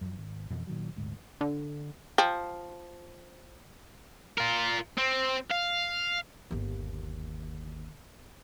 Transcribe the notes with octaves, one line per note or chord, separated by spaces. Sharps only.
F#2 F3
G#1
F2 B2 E3 F3
A#2 D#3 F#3
D#1 G#1 D2 G#2
D3
F3 G5
F4 A#4
C4
F5
G1 D#2